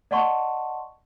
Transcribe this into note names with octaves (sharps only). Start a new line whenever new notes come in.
D5 D#5 F#5 A5 C6 C#6